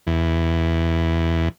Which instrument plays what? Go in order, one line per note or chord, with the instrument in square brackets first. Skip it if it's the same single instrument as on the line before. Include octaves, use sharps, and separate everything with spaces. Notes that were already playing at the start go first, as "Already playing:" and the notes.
[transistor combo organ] E2